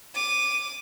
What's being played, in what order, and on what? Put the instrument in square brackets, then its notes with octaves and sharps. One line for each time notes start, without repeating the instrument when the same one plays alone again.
[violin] D6 D#7